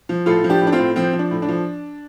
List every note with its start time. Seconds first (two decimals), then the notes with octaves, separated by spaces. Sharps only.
0.09 F3
0.26 A2 F4 A4
0.44 F3
0.50 D4 G4
0.61 A2
0.67 D4
0.72 C4 F4
0.79 A2
0.96 F3 C4
1.13 F3
1.19 D4
1.31 A2
1.42 D4
1.48 F3